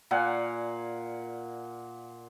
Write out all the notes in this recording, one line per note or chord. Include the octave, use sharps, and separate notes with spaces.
A#2 F5 F#5 G#5